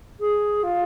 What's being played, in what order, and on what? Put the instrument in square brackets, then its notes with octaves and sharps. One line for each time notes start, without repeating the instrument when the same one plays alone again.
[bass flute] G#4
F4